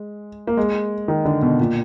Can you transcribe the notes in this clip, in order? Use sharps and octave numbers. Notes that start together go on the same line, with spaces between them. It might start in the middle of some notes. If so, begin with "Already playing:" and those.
Already playing: G#3
A#3
G#3
D#3
D3
B2
A#2